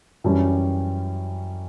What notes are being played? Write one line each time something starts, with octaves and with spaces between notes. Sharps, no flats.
F#2 E3 G3 C#4